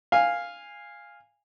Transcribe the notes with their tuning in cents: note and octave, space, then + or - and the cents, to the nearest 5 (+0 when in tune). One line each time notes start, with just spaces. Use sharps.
F5 +0 G#5 -15